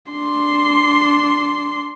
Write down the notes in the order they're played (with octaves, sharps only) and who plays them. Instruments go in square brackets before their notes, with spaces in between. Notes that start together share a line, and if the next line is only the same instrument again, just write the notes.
[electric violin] D4 C6